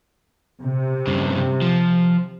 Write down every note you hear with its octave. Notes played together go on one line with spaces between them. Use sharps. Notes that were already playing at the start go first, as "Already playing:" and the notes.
C3
G2 C#3
F3